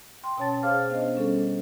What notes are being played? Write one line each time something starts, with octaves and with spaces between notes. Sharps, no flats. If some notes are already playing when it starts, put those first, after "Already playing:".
G5 C6
B2 C#4 C#5 A5 A6
G#4 C5 C#5 F5 D6 F6
B3 D4 C5 D#5
G3 C#4 A4